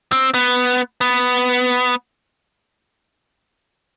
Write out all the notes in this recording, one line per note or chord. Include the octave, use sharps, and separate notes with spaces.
C4
B3
B3